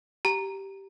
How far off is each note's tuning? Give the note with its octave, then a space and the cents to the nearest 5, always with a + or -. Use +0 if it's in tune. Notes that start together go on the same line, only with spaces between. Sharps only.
G4 -10 A#5 +0